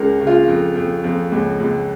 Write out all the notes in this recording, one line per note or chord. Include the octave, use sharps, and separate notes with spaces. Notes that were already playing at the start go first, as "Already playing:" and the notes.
Already playing: C#2 C#3 A#4
C#3
F4
F2
F2
F2
C#2
C#2